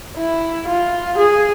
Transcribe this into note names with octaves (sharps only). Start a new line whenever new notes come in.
E4
F4
G#4